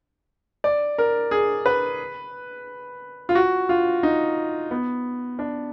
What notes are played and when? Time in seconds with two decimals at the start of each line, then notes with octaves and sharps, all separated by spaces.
0.64 D5
0.98 A#4
1.31 G#4
1.66 B4
3.29 F4
3.35 F#4
3.69 F4
4.03 D#4
4.71 B3
5.39 D4